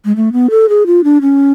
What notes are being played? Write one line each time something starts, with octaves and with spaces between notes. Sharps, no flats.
G#3
A3
B3
A4
G#4
F4
D4
C#4